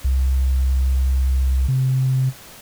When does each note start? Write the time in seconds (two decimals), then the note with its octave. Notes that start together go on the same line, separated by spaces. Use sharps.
0.04 C2
1.68 C3